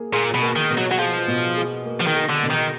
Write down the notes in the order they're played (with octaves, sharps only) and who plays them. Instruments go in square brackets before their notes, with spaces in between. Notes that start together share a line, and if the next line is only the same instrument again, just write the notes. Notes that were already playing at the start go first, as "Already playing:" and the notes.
Already playing: [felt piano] A#3 G#4
[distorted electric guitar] A#2 [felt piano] G#4
[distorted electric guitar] B2
[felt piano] A#3
[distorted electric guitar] D#3
[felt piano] B2
[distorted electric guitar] F#3
F#3
[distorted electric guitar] F3 [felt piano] G#4
[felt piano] B2
G#4
A#3
[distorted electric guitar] F3
D#3
[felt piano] G#4
[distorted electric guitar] D3
[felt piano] B2
[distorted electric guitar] D#3